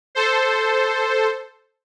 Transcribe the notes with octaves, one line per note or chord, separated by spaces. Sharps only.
A4 C5